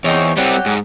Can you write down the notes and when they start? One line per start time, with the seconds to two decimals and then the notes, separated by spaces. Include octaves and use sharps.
0.04 E2 C4 D#4 C#5
0.37 F#3 G3 C4 G4
0.66 G#2